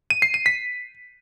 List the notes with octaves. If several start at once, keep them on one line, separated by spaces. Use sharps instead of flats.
D#7
C7
D#7
B6